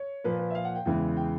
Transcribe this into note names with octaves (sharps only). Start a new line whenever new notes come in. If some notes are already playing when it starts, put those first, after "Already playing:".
Already playing: C#5
A#2 F3 A#3 B4
B4
E5
F5
F#5
G5
E2 C#3 E3 G#3 G5
G5